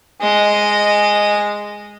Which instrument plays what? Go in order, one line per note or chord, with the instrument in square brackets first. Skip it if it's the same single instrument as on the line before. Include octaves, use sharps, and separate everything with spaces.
[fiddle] G#3 D#5